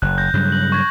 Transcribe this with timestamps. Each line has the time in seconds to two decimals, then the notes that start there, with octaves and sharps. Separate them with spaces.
0.02 F#1 F#6
0.18 G6 A#6
0.34 G2 C#3 F#3
0.52 F#7
0.72 C#6 G#6 A#6